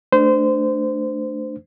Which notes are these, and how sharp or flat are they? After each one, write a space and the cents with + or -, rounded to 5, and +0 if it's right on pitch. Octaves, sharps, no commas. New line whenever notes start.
A3 +5 D4 +10 C5 -25